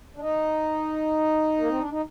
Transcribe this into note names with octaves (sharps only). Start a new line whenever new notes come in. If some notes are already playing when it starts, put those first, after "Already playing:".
D4
D#4
A#3
C4
D4
D#4